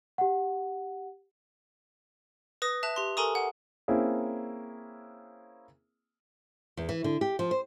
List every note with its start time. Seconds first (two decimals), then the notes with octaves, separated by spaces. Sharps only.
0.18 G4 F#5
2.62 B4 D#6 A#6
2.83 E5 A5 F#6 F7
2.96 G4 C6
3.17 A4 A#4 G#5 A#5 C#6 D#6
3.35 F#5
3.88 A#3 C4 C#4 E4 G#4
6.77 E2
6.89 E3
7.04 D3
7.21 G4
7.39 F3
7.51 C5